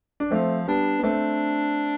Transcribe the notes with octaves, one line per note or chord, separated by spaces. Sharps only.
D4
F3 A3 C4
G3 B3 D4
B3
A3 C4 D4